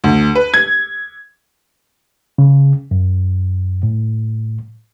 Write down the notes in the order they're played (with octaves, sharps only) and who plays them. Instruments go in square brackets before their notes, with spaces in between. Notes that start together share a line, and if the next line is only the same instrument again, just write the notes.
[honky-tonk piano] D2
B4
G#6
[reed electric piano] C#3
F#2
A2